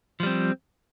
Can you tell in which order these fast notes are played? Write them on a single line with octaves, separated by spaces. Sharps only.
F3 G3 C4